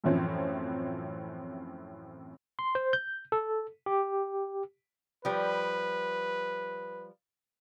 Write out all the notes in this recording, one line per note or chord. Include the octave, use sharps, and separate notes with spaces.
F#2 A2 E3 F3 C4 C#4
C6
C5
G6
A4
G4
F3 G3 B4